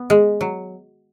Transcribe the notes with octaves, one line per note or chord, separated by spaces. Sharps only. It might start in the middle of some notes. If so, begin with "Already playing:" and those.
Already playing: B3
G#3
F#3